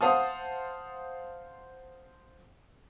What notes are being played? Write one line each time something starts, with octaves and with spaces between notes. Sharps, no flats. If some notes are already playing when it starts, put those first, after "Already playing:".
C5 F5 F#5 A5 D#6